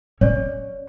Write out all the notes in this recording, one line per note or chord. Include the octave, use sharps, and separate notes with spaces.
C#4 C#5 D5